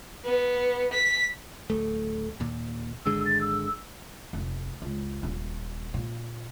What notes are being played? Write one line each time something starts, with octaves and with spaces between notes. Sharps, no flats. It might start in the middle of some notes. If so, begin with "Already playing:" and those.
B3
B6
D1 A3
D#2 A#2
G#1 D3 G#3 E6
A6
E6
F1
C#2
D#1
A#2